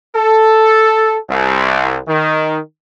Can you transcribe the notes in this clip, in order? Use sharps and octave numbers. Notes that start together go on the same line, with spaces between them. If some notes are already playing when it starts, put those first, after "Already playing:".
A4
C2
D#3